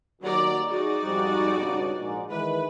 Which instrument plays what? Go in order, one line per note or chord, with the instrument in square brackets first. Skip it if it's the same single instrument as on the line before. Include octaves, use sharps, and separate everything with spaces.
[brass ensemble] D#2 D#3 F#4 [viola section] F#3 D5 A#5
[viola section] D#4 F#4 D5 [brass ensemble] G#4
[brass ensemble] F2 G#2 G3
C#2 G2 B2
A#1 G#2
[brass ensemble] D#3 E3 G#3 [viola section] B4